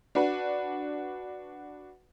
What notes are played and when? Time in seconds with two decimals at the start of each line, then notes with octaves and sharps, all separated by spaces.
0.15 D4 F#4 B4